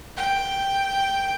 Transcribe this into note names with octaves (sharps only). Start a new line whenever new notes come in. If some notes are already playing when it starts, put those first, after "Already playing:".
G5